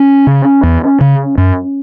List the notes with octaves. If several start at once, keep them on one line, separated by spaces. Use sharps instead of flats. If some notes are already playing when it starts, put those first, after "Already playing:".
Already playing: C#4
C#3
E2
C#3
F#2